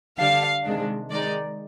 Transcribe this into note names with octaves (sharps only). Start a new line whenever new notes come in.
D3 G3 D4 F5
C3 D#3 G#3 D4
D#3 G#3 D#4 D5